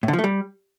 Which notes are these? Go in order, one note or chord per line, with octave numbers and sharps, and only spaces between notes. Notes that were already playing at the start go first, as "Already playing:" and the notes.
A2
D3
F3
A3
G3